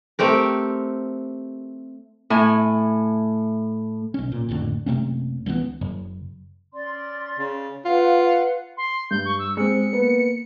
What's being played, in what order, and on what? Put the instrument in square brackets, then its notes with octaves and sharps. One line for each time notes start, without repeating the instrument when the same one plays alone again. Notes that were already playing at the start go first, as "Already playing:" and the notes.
[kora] A3 C4 G4 A#4
[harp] A2 G#5
[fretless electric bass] B1 C#4
A#2
A#1 F2 A2 D3
F#1 C3 A3 C#4
C#2 E3 A3 B3
[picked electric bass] F#1
[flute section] C#4 D5 C6
[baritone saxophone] C#3
[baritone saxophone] F4 [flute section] B4 F5 F#5
[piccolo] C6
[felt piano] G2 [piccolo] G6
[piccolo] C#6
E6
[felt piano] G#3 C4 [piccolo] C#7
[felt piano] A#3 B3